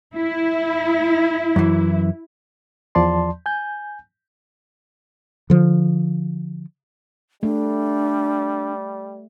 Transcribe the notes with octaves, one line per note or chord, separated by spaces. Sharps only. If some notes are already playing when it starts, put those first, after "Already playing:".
E4
F#2 E3
E2 F3 D5 A5 C6
G#5 G6
D3 F3
G3 A3 D4